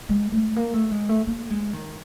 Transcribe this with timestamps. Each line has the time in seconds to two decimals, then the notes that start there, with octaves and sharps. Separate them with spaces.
0.09 G#3
0.32 A3
0.56 A#3
0.74 A3
0.91 G#3
1.09 A3
1.27 A#3
1.50 G#3
1.73 D#3